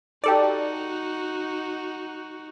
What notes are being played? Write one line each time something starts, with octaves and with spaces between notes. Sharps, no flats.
D#4 F#4 G4 A4 D5